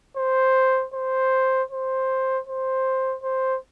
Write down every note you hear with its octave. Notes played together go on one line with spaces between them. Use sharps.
C5
C5
C5
C5
C5